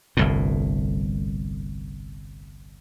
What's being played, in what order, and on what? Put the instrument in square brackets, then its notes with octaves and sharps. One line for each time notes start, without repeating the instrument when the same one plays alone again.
[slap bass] G1 C2 A2